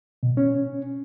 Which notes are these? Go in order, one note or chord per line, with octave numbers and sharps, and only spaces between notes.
B2
C#4